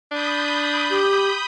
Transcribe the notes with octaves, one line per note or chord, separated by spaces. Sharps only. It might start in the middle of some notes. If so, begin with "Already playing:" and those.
D4 B5 D#6 G6
G4